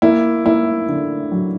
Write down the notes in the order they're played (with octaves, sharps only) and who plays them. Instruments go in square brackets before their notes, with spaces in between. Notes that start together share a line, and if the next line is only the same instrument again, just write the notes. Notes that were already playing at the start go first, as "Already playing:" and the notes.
[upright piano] A#3 E4
A#3 E4
D3
F#3